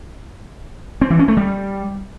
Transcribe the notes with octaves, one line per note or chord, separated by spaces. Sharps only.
C4
E3
C#4
A3
G3